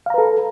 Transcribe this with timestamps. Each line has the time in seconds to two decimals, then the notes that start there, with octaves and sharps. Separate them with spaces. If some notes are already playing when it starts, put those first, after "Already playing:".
0.06 F5
0.10 A#5
0.14 B4
0.18 A4